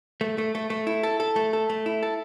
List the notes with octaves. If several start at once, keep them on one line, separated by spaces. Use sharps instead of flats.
A3
A3
A3
A3
E4
A4
A4
A3
A4
A3
E4
A4